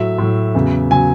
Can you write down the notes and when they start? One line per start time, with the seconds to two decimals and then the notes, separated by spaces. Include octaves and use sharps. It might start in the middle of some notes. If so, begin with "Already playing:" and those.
Already playing: A2 F#3 E5
0.18 A2 F#3
0.54 E2 C#3 F#3
0.91 C#3 F#3 G#5